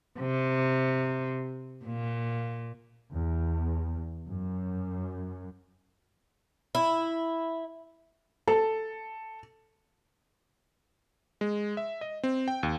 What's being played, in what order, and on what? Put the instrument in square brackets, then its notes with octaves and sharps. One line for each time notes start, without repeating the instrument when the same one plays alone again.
[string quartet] C3
A#2
[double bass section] E2
F#2
[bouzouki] E4
[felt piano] A4
[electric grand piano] G#3
E5
D#5
C4
G5
D#2